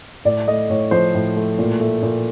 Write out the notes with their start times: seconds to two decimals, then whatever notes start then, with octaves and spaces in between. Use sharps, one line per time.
0.25 A2 D5
0.48 A3 D#5
0.70 A2 C#5
0.91 F3 C5
1.14 A2
1.36 A3
1.59 A#2
1.80 A3
2.03 A#2